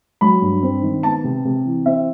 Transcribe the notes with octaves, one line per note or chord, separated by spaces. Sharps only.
F#3 B5
G2
C4
D#3
B3 A5
C3
C3
E3
C4 E5